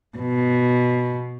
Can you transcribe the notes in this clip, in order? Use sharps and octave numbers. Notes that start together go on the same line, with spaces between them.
B2